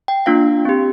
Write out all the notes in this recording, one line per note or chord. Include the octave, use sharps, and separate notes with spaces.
G5
A#3 D4 F4 F5
C4 G4